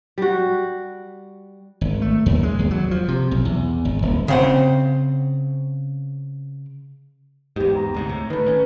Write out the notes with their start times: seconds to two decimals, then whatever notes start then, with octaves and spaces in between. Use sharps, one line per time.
0.18 G3 F#4
1.81 G#1
2.02 A3
2.26 D#2
2.43 G#3
2.59 D#2
2.71 F#3
2.91 F3
3.08 C3
3.31 B1
3.45 E2
3.85 G#1
4.02 D#1
4.28 C#3 C4 F#5
7.56 E2 G#2 G4
7.76 A#5
7.94 D2 G#2 C3
8.09 A2
8.30 D#3 A3 B4
8.46 A1 D#3 C#4